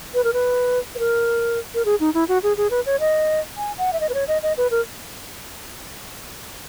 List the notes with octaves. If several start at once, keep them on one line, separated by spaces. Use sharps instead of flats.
B4
A#4
B4
B4
A#4
A#4
G#4
D#4
E4
F#4
G#4
G#4
B4
C#5
D#5
G#5
F#5
E5
D#5
B4
C#5
D#5
D#5
B4
A#4